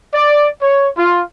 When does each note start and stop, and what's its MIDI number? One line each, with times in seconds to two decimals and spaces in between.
0.13 0.49 74
0.61 0.88 73
0.96 1.22 65